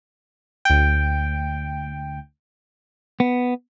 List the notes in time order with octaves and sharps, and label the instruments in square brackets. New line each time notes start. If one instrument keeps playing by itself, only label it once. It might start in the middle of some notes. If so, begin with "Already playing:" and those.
[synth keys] D2 G5
[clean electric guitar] B3